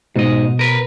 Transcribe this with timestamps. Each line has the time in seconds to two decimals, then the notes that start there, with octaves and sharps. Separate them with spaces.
0.16 G#2 B2 D#5
0.59 A#4 B4